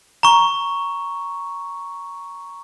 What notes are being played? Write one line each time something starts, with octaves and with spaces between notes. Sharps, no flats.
A#5 C#6